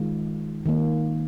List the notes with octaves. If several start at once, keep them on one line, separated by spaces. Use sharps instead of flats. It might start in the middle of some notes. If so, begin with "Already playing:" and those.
Already playing: D#3 G#3 F4
D#3 A#3